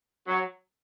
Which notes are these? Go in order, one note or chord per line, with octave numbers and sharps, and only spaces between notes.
F#3